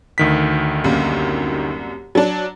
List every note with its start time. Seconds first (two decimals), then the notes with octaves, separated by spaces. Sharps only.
0.18 D2 D#3 B6
0.84 C2 F#2 A#3
2.15 F#3 D4